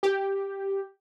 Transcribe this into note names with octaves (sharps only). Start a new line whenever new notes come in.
G4